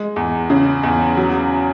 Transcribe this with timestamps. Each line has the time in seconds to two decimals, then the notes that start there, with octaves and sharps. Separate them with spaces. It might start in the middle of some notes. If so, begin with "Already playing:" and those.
Already playing: G#3
0.16 E2
0.50 C#3
0.83 E2
1.17 F#3